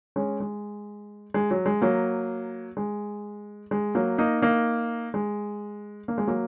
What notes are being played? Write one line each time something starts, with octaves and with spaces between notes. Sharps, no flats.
G#3 C#4
G#3
G#3
F#3
G#3
F#3 A#3
G#3
G#3
F#3 A#3
A#3 D#4
A#3 D#4
G#3
A#3
G#3
F#3 A#3